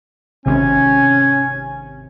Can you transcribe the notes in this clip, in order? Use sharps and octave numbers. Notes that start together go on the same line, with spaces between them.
G#1 C3 C#4 G#5